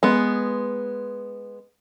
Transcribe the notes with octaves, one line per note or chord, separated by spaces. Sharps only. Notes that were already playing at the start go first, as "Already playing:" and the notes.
G#3 B3